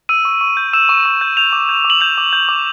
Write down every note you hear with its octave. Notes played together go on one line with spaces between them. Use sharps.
E6 D#7
C#6
C#6
G6
E6 E7
C#6
C#6
G6
G6 F7
D6
G6
D6
F#7
G6 F7
D6
G6
D6